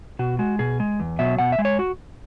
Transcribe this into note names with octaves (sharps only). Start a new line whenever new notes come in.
B2 F#4
G#3 F#4
B2 G#4
G#3
E2
B2 F#3 E5
B2 F#5
E5
G#3
C#5
F#4